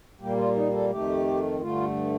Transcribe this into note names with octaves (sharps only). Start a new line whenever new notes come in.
A#2 G3 A#3 G4
F4
D#4
A4
F2 D#3 A3 G4
G2 D3 A3 F4